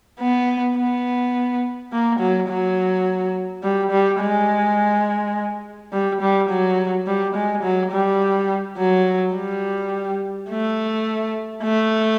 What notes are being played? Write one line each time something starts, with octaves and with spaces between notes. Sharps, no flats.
B3
B3
A#3
F#3
F#3
G3
G3
G#3
G3
G3
F#3
G3
G#3
F#3
G3
F#3
G3
A3
A3